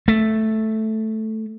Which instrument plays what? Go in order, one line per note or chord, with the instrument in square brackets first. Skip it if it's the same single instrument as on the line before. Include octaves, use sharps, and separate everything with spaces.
[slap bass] A3